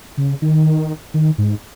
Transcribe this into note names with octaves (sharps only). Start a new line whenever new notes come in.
C#3
D#3
D#3
G#2